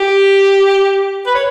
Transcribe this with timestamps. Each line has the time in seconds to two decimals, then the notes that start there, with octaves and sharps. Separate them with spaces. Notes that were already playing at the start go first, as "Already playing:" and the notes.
Already playing: G4
1.26 B4
1.35 C#5